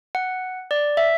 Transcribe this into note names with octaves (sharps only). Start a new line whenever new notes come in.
F#5
D5
E5